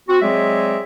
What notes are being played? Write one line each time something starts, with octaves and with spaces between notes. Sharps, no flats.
C4 F#4
F#3 G#3 C4 G#4 D5 E5